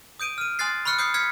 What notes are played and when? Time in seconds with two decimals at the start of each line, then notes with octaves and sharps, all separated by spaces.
0.20 D#6 G6 D7 D#7
0.38 F6 D#7
0.59 G#5 C6 D#6 F#6 A6 C7
0.85 B5 C#6 F6 F#6 C#7
0.99 D#6 G6 C7 C#7
1.14 F6 G#6 B6 C#7